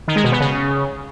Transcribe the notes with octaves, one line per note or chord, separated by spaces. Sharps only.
D#3
G#3
B2
B3
C#3